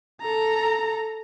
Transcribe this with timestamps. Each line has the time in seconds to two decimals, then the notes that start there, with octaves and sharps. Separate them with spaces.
0.21 A4 A#5